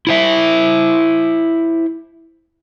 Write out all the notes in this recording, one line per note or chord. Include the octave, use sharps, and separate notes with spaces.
E4 C5 E5